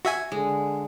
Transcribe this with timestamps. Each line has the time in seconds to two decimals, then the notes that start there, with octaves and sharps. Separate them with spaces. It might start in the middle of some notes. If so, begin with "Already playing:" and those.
0.05 F#4 E5 G#5
0.32 D3 G#3